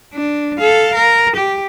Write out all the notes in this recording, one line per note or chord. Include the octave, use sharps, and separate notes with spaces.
D4
A4 F5
A#4
G4